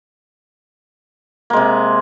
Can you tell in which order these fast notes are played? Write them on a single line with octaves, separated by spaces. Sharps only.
A#3 G#3 C3